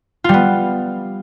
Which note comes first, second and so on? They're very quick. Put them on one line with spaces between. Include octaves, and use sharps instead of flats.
F4 G3 B3